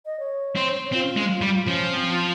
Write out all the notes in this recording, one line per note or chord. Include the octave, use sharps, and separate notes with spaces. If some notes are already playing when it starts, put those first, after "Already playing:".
D#5
C#5
C4
C4 F4
G#3
G3
F3 C#4
C4